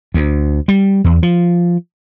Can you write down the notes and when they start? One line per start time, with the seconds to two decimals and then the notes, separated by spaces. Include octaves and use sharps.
0.14 D2
0.68 G3
1.04 E2
1.23 F3